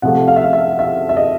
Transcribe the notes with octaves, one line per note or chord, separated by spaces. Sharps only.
C3 F3 A3 F#5
F5
E5
F5
E5
E5
E5
D#5